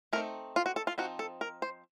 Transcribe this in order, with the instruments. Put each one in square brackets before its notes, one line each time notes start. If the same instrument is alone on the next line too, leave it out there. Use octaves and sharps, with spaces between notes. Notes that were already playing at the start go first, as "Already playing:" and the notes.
[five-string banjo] A3 A#4
C4 D#4
F4
F#4
A4
F4
F3 C4 D#4 F#4
A4
A#4
C5